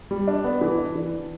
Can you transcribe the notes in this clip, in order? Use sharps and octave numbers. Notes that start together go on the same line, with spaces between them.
G3
D4
B3
E3
D4
E3